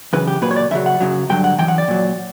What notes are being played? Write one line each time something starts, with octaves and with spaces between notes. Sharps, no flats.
F#2 C#3 E3 B4
G4
A#2 F#3 B4
C#5
D5
F#2 C#3 F#3 E5
F#5
F#2 C#3 F#3
G2 D3 F#3 G5
F#5
F#2 E3 G5
F#5
D5
A#2 F#3